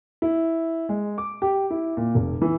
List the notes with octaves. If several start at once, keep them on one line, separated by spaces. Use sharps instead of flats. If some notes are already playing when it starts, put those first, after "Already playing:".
E4
G#3
D6
G4
E4
A#2
F1
E3